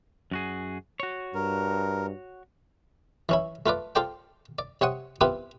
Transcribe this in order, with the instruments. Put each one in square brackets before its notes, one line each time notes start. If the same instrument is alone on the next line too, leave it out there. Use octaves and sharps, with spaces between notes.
[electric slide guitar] F#2 F#4 G#4
F#4 C#5
[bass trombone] G2 [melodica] A#4
[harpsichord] E3 C#4 E4
A3 F4 B4 D5
F4 A4 C5 D5 G5
D5
C3 C4 C#5 F#5 D#6
B3 C4 E4 F4 G4 B4